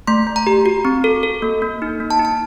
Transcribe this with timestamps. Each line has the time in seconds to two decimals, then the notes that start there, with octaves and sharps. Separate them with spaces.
0.07 A3 C6
0.27 A3
0.36 A#5
0.47 G4
0.66 F#4
0.85 C4
1.04 A4
1.23 A4
1.42 A#3
1.62 A#3
1.82 D#4
2.00 A#3
2.11 A5
2.19 D#4
2.25 A5